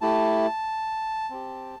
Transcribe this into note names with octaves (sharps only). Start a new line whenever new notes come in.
A3 E4 G4 A5
C4 G4